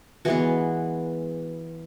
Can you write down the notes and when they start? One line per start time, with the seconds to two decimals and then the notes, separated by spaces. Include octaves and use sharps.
0.25 E3 G#3 B3 F#4